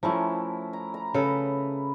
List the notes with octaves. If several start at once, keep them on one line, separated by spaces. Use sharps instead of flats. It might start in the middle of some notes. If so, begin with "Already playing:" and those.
F3 A3 C#4 E4 A#4
A#5
A#5
C#3 A4 B4 A#5 B5